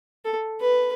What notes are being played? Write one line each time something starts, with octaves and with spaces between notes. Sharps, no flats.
A4
B4